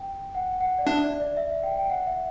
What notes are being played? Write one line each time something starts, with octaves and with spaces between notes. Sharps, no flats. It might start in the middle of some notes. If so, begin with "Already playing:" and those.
Already playing: G5
F#5
F#5
D5
D4 E5
D5
D5
E5
E5
G5
G5
F#5
E5